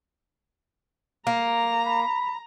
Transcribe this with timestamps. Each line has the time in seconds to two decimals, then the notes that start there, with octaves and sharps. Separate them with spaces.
1.27 A#3 A#5
1.86 B5